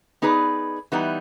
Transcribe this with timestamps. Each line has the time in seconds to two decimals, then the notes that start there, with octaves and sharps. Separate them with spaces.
0.22 B3 D#4 G#4 B4 D5
0.92 E3 G3 B3 D#4